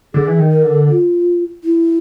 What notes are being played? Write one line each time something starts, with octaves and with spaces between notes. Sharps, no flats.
D3 G#4
E3
D#3
A#4
D3
F4
E4